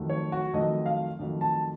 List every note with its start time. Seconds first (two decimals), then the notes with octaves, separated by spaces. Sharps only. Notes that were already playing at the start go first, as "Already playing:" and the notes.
Already playing: F2 D#3 F#3 A3
0.10 C#5
0.32 F#4
0.53 F2 D#3 F#3 A3 D#5
0.86 F5
1.19 F2 D#3 F#3 A3
1.41 A5